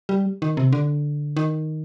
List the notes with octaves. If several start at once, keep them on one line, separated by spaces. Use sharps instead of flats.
G3
D#3
C3
D3
D#3